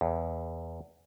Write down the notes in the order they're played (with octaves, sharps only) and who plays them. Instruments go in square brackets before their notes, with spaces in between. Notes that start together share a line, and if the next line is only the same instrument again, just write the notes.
[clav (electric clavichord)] E2